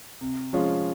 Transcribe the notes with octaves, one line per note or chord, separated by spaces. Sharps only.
C3
F3 G#3 C#4 F4